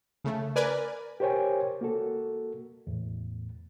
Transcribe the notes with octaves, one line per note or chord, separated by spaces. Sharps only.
C#3 A3
A#4 B4 D5 G#5
G4 A#4 C5 C#5 G5 G#5
A#3 F#4 A4
E2 A2